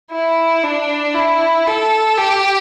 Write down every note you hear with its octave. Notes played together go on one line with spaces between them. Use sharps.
E4
D4
E4
A4
G4